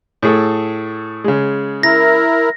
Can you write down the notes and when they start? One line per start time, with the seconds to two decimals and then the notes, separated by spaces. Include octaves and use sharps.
0.23 A2 G#4 A4
1.24 C#3 G#3
1.83 E4 A#4 A#6